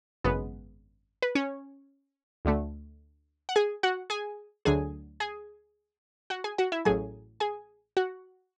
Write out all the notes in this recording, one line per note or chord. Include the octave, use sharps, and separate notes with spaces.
G#1 F#2 C#3 G#3 B3 B4
B4
C#4 C#5
D2 D3 A3
F#5
G#4 G#5
F#4 F#5
G#4 G#5
D2 D3 F#3 G#4 G#5
G#4 G#5
F#4 F#5
G#4 G#5
F#4 F#5
E4 E5
A1 A2 F#3 G#4 G#5
G#4 G#5
F#4 F#5